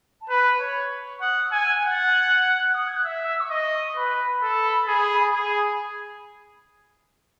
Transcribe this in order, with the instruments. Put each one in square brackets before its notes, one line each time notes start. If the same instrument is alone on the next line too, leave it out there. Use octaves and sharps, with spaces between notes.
[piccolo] A5
[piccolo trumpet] B4 [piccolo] B5
[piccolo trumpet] C#5
[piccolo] C#6
[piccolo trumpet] F#5 [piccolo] D#6
[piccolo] E6
[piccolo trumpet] G#5
[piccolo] F#6
[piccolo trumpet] F#5
[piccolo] A6
G#6
F#6
D#6
G#6
F#6
[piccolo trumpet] E5 [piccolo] E6
[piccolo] E6
C#6
[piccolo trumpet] D#5 [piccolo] D#6
[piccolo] C#6
[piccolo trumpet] B4 [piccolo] B5
[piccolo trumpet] A4
G#4
G#4